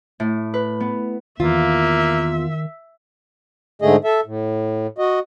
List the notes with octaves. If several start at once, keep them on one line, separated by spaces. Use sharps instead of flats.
A2
B4
B3
E2 D#3 A#3 F4 E5
G#2 D3 A3 G#4 D#5
A4 E5
A2
F#4 D#5